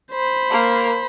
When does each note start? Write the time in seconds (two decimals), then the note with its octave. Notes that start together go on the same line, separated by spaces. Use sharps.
0.12 C5 B5
0.50 A#3 A#4